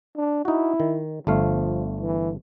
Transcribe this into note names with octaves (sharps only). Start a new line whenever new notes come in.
D4
D#4 E4 F#4
D#3
G1 F3 A3 F5
E3